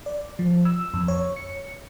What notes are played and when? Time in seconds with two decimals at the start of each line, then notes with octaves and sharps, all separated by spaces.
0.06 D5
0.39 F3
0.65 E6
0.94 F2
1.08 C#5
1.36 C#7